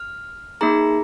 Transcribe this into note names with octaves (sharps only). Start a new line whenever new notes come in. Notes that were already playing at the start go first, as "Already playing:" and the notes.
Already playing: F6
A#3 D#4 G#4 A#5